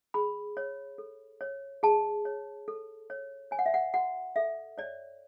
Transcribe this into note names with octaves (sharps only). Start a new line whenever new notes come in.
G#4 B5
C#5
A4
C#5
G#4 A5
C#5
A4
C#5
C#5 G#5
F#5
E5
F#5
F#4 F#5
A4 E5
C#5 D5